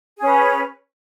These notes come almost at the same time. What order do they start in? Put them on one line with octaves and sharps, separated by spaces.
G#4 C#4 B4